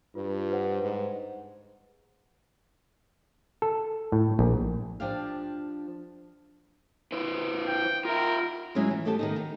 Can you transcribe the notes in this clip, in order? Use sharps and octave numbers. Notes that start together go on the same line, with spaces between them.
G2 F4 B4
B4 C5 F#5
G#2
A4
A2
A#1
F3 D4 G4 F5
E4 B4 C5
G5
F4 A#4 E5
F#3 G#3 C#4 E4 F4 G#4
E3
A3 B3 G4 A4 G#5 A5
D#3 B3 D#4
D#3